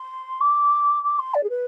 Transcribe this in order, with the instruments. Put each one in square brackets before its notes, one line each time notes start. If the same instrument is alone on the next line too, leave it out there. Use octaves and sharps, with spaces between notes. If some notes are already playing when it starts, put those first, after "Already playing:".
Already playing: [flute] C6
D6
D6
C6
D5
G#4
B4